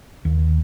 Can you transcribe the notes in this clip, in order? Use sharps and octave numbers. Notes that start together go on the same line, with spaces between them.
D#2